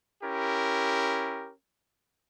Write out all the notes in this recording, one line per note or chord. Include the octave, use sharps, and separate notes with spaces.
C#4 E4 G4 A#4